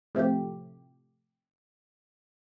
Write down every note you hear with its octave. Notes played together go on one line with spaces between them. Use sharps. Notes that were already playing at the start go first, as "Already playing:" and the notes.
A2 C3 F3 A3 G4